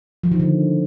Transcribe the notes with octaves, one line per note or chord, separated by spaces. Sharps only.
F3
D#3
D3